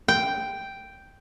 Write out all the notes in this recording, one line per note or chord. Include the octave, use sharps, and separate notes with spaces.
G5